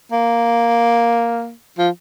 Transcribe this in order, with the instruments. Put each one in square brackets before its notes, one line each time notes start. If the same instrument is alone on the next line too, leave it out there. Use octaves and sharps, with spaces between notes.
[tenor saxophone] A#3
F3